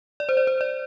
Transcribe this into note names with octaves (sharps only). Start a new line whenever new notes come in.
D5
C5
D5
C5
D5